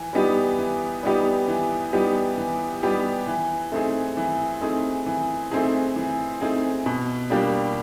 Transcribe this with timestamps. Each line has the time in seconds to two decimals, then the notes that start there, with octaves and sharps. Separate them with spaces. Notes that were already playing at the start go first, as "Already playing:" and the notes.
Already playing: E3
0.13 G3 B3 D#4 G4
0.58 E3
1.03 G3 B3 D#4 G4
1.48 E3
1.93 G3 B3 D#4 G4
2.37 E3
2.83 G3 B3 D#4 G4
3.27 E3
3.72 A3 C4 D#4 G#4
4.17 E3
4.61 A3 C4 D#4 G#4
5.06 E3
5.51 A3 C4 D#4 G#4
5.96 E3
6.41 A3 C4 D#4 G#4
6.86 B2
7.30 G3 A#3 D4 G4